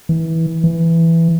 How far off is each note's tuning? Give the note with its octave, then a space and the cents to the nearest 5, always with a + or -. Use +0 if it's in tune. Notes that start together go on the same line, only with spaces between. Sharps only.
E3 -20
E3 +5